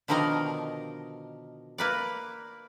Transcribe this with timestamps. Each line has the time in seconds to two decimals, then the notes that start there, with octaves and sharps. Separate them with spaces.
0.08 B2 D3 D#3 F3 A#4 D#5
1.78 A#3 B4 D5